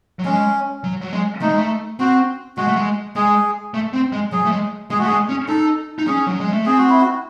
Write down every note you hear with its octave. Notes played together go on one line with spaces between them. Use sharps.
F#3
G#3 C#4
F#3
F#3
G#3
A3 D#4
G#3
A3
C4 F#4
G#3 F#4
A3
G#3
G#3 G#4
A3
C4
G#3
F#3 G#4
A3
G#3
G#3 G#4
F#4
A3
G#3 G#4
C#4
D#4 A4
D#4
C#4 G#4
F#3
G#3
A3
C4 G#4
F#4
E4
F#4